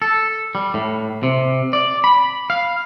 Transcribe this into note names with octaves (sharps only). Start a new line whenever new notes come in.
A4
G3
A2
C3
D5
B5
F5